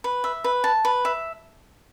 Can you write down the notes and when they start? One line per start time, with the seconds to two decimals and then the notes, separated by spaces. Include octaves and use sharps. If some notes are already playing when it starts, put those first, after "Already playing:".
0.04 B4
0.24 E5
0.44 B4
0.64 A5
0.85 B4
1.05 E5